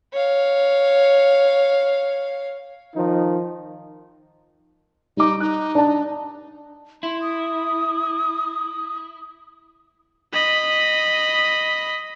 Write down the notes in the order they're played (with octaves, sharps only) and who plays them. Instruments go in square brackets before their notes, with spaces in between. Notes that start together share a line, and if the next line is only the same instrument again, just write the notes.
[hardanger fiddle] C#5 F5
[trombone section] D#3 F3 D#4
[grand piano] G3 D6 [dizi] D#4
[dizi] D#4 [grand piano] F#6
[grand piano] D4 A5
[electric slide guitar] E4 [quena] C6
[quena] D#6
[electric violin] D#5 B5